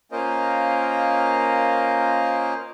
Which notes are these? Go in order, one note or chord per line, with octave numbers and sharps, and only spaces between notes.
A#3 C#4 F4 A#4 C5 D#5